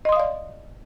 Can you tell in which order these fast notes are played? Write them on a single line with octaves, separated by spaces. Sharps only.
D#5 C6 D#6 F5 D5